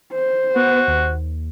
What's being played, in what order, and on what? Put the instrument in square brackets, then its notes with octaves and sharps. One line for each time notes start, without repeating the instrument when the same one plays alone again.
[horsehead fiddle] C5
[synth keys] B3 [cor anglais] F#4
[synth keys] D#2